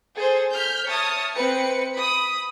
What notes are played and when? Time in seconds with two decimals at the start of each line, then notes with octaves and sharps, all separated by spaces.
0.15 G#4 A4 C5
0.53 F6 G6 B6
0.86 C#5 E5 A5 D#6 F6
1.34 C4 B4 C#7
1.93 B5 D#6